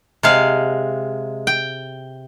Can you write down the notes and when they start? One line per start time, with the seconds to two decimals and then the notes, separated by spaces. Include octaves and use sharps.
0.23 C3 G#3 F5
1.47 G5